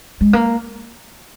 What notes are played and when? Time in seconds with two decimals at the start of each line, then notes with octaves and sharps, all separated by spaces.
0.21 G#3
0.33 A#3